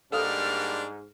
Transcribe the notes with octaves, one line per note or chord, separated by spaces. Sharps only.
G#2 G3 A#3 D4 A4 F5 D#6 F6